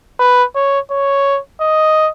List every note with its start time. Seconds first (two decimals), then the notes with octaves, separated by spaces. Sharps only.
0.20 B4
0.55 C#5
0.91 C#5
1.60 D#5